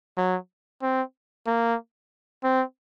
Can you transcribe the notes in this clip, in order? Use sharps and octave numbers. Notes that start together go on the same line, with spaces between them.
F#3
C4
A#3
C4